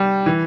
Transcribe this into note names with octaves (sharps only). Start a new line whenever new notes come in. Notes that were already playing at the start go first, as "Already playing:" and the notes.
Already playing: G3
E3